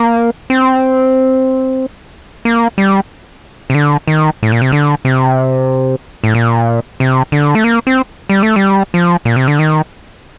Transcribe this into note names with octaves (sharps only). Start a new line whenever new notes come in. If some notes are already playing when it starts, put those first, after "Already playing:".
Already playing: A#3
C4
A#3
G3
C3
D3
D#3
A2
A#2
C3
D3
C3
A2
A#2
C3
D3
A3
A#3
C4
G3
A3
G3
F3
A#2
C3
D3
D#3